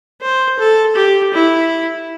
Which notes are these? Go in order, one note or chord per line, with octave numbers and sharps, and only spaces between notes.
C5
A4
G4
E4